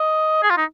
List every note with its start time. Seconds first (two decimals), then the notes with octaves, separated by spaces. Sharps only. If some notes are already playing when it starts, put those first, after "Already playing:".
Already playing: D#5
0.43 G#4
0.50 F4
0.57 D#4